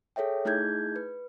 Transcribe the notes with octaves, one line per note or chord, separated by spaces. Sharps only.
G#4 A4 C#5 E5 G5
A3 D#4 E4 G#4 G6 G#6
B4